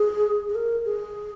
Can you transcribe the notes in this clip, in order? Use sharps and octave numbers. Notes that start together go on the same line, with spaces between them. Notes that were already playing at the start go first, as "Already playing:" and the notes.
Already playing: G#4
G#4
A#4
G#4